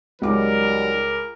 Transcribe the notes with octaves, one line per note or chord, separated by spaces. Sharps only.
C#2 F#3 G3 D#4 A#4 D6